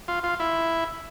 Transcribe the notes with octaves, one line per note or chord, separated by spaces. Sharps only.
F4
F4
E4